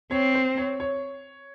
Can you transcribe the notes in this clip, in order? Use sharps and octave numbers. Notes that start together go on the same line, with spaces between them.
C4 C#5
C5
C#5
C#5